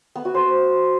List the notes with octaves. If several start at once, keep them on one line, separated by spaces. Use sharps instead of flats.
B3
F#4
C5